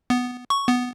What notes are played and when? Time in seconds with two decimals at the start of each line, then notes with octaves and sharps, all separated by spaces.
0.10 B3
0.50 C#6
0.68 B3